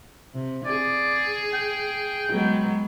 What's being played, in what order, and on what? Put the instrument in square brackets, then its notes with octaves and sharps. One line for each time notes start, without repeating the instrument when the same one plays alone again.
[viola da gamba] C3
[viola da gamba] G#4 [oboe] D5
[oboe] G5
[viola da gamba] F#3 G#3 B3